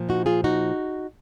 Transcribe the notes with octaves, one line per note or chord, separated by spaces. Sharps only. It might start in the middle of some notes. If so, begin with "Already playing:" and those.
Already playing: A#2 F3
D#4 F#4
F4 G#4
D#4 F#4